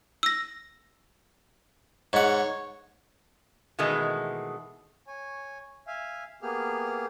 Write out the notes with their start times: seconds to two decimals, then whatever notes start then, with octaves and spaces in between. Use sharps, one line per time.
0.23 E6 A#6
2.13 G#2 C#5 F#5
3.79 B2 D#3 E3 G#3 A3
5.07 C#5 G#5
5.87 E5 F5 G#5
6.42 A#3 B3 G4 G#4 F6